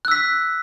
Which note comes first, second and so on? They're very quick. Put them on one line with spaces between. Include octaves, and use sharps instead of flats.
F#6 E6 B6